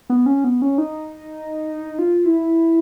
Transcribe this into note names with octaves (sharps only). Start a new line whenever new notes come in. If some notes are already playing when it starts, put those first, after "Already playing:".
B3
C#4
B3
C#4
D#4
F4
E4